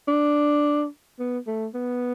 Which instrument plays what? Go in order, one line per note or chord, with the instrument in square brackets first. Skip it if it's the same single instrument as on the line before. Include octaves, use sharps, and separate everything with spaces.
[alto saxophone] D4
B3
A3
B3